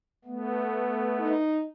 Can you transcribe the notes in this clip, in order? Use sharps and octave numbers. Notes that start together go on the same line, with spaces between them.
A3 B3
D#4